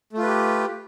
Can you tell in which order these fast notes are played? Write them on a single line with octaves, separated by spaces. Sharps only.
A3 F4 B4 G4